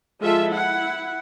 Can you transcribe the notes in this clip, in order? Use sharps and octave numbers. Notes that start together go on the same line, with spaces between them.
F3 G#3 F4 A4 E5
E4 F#5